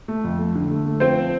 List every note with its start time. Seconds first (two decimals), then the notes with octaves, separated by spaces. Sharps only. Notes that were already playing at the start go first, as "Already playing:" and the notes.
0.08 A3
0.24 F2
0.39 A3
0.55 D3
0.71 A3
0.86 A3
1.00 F3 C4 C5